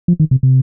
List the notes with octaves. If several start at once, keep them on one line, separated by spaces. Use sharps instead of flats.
F3
D#3
C3
C3